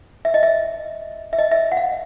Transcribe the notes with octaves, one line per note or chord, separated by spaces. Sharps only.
E5
D#5
E5
E5
D#5
E5
F#5
F5